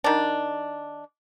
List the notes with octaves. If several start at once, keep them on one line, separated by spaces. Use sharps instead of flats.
D#3 D4